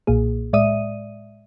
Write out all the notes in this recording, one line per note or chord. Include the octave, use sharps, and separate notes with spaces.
B1 A#2 A#3 G#4
A2 G#3 D5 E5 D#6 D#7